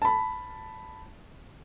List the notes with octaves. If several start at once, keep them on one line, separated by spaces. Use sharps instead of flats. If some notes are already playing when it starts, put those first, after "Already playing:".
A5 B5